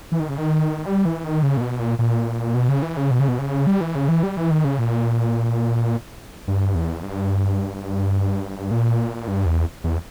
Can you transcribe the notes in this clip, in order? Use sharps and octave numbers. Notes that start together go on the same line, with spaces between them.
E3
D#3
C#3
D#3
G3
E3
D#3
C#3
A#2
B2
A#2
A#2
B2
C#3
E3
C#3
B2
C#3
B2
C#3
G3
E3
C#3
E3
G3
E3
D#3
C#3
A#2
G2
E2
G2
A#2
G2
E2
E2